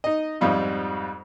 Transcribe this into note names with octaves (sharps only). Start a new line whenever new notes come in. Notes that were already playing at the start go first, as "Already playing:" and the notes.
D#4 D#5
F2 G#2 G3 D#4 F4